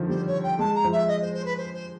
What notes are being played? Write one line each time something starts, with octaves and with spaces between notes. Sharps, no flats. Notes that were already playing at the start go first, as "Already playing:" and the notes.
Already playing: D3 D#3 F3
G3 C5
C#5
G5
G#3 A5
A#5
F3
E5
D#5
C5
C5
B4
C5
C5